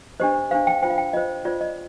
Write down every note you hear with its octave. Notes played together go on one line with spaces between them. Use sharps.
D4 G4 C5 D#5
D4 G4 C5 F5
G5
F4 C5 G5
F5
G5
F4 C5 D#5
F4 C5 D5
D#5